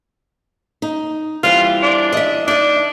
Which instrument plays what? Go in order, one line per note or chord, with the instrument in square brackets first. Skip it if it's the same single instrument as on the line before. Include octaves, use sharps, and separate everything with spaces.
[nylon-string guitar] D#4
[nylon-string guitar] E3 G3 C4 [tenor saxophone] F4
[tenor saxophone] D4
[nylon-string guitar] D#5 E5
[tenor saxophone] D4 [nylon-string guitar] D#4 E5